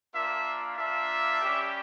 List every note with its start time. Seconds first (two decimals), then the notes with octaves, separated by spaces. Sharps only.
0.14 A#3 D4 F4 E5
0.77 A#3 D4 F4 E5
1.41 G3 C#4 G4